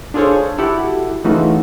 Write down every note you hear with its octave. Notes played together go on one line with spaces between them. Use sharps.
D4 F4 G#4 A4 C5 C#5
E4 F#4 G4 A4 F#5
C#3 E3 A3 D#4 F4 F#4